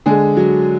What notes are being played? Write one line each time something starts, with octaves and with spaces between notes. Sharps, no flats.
D3 G#3 G#4
F#3